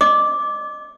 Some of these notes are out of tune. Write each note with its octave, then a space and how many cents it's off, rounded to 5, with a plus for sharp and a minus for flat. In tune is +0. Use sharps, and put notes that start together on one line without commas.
D#5 -30 D6 -5